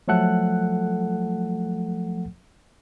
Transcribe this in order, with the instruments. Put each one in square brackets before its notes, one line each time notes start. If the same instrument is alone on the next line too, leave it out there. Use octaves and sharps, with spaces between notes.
[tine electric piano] F3 F#3 A3 A4 F#5 F#6